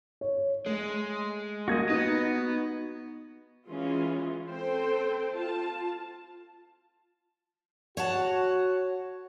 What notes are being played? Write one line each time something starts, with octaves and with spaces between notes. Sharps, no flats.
C#5
G#3 A3
G3 A#3 F#4 D#5 G#6
B3 D#4
E3 G#3 C#4 F4
C4 A4 C5 G5
F4 A5
F#4 C#5 F#5 A5